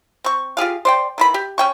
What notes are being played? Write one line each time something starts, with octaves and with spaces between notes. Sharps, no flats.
C4 C#6
F4 G4 G#4 F5
C5 D5 G5
D#3 E3 B5
G4
C#4 G5 C#6